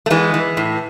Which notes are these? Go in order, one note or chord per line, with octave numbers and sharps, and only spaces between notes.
A3
E3 G#3 B3
E3
A2